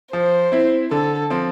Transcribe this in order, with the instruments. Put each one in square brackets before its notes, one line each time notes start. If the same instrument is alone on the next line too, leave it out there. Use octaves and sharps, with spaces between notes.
[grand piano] F3 [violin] C5
[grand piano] C4 E4
[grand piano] D3 [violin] A4
[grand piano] F3 C4